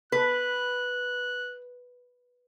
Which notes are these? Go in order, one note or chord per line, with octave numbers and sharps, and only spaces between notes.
B4 F#6